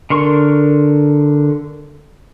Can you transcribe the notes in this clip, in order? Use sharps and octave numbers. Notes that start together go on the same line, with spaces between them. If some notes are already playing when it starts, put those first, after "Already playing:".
D3 A#4 C6 C#6